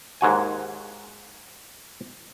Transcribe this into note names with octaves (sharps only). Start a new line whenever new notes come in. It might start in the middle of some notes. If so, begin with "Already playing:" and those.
D#2 G#2 F#4 G#5